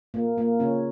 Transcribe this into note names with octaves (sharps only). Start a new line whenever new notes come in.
A#2 A#3
A#2 A#3
C#3 C#4